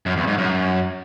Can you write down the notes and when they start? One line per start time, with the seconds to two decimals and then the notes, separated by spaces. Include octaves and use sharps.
0.06 F#2
0.17 E2
0.27 G#2
0.38 F#2